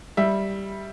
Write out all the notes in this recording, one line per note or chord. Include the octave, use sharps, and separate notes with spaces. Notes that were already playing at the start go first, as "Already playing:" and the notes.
G3 E5